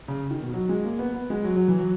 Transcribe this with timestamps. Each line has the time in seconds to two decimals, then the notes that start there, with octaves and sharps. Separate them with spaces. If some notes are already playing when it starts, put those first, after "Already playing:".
0.08 C#3
0.31 D#3
0.42 B2
0.53 F#3
0.69 G#3
0.84 A#3
0.99 B3
1.14 B3
1.30 G#3
1.44 F#3
1.56 F#3
1.68 E3
1.78 F#3